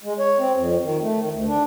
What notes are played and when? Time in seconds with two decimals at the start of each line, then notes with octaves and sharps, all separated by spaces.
0.04 G#3
0.19 C#5
0.39 C4
0.56 F2
0.84 D#3
1.02 A3
1.20 D#3
1.32 D2
1.47 D4